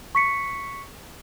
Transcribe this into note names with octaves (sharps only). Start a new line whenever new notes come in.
C#6 B6 C#7